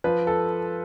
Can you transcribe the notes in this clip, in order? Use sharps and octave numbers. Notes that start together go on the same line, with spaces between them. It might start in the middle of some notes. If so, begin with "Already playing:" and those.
F3 B4
A4